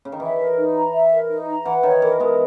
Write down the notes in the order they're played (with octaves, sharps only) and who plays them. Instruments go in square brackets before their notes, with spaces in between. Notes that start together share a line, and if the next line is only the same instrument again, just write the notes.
[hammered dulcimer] C#3
D#3
[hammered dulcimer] E3 [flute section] E5
[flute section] A#4
D#4
A#5
E5
A#4
D#4
A#5
[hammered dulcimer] E3 [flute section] F#5
[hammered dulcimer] D#3 [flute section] C#5
[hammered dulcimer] E3 [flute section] A#4
[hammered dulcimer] G#3 B3 [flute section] A#4